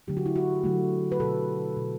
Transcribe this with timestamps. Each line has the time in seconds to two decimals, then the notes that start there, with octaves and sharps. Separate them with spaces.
0.07 D3 F#3 A3 G4
0.17 F#4
0.26 E4
0.36 F#4
0.64 D3 F#3 A3
1.12 B4
1.20 B2 A3 A4
1.77 B2 A3